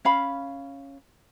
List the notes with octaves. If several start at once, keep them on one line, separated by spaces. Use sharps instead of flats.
C#4 F5 B5